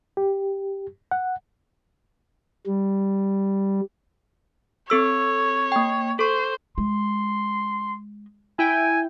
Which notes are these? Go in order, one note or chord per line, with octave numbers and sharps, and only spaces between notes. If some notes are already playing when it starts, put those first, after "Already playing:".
G4
F#5
G3
C4 A4 C#5 E6
A#3 G5
A4 C5 C#6
G#3 C6
E4 G5 G#5